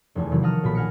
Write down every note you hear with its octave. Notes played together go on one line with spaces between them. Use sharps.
F1 E2 A3 G#5
C3 D#3 E3 F#3 G3 A#3
C#5 F#5 A5 A#5 D#6 F6
B1 A#2 F#4 B5
F#5 G#5 F6 A#6 C#7